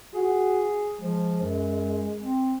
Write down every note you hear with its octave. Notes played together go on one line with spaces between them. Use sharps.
F#4 G#4
F3 G#3
F#2
C4